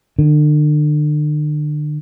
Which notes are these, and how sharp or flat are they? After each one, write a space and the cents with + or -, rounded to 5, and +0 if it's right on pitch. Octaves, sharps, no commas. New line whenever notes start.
D3 +40